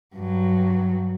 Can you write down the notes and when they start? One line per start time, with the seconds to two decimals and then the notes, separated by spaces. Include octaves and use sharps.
0.16 G2 F#3